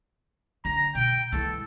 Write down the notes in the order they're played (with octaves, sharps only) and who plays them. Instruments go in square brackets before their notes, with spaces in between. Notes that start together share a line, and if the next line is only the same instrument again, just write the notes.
[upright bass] D3 [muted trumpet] A#5
[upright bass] B2 [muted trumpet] G5
[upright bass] E3 G#3 [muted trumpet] A4